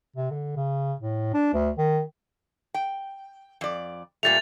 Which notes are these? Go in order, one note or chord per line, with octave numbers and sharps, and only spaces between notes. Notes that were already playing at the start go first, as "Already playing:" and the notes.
C3
D3
C#3
A2
D4
D2
D#3
G5
F2 D5
A#2 G3 A3 A6 F7